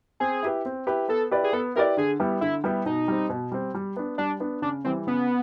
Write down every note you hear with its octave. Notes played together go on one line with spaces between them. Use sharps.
C4 G#4
E4 G4 B4
C4
E4 G4 B4
B3 A4
E4 G4 B4 D5
G#4
B3 A4
E4 G4 A#4 B4 D5
D3 G#4
G3 B3 E4 G4
D3 E4
G3 B3 E4 G4
B2 D#4
G3 C4
B2
G3 C4
G3
B3 D4
G3 D4
B3 D4
C#3 D4
E3 G3 C4
C#3 B3